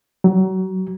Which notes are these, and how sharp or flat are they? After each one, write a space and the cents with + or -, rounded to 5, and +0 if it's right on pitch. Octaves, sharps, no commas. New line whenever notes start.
F#3 +30